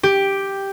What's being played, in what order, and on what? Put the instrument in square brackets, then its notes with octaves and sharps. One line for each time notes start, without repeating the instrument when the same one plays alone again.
[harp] G4